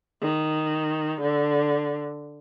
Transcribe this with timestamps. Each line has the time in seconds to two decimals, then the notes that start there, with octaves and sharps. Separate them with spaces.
0.21 D#3
1.21 D3